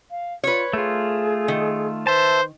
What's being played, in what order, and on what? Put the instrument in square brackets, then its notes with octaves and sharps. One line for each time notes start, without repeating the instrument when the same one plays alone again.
[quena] F5
[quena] F4 [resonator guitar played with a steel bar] B4 C#5
[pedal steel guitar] A3 F4 [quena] G#4
[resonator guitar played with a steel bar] D#3
[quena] B4 [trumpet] C5 [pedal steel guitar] E5 A5